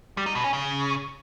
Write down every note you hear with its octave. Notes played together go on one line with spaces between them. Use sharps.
G3
D#4
B2
C#4
C#3